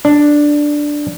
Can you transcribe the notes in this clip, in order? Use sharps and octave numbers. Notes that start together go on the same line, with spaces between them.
D4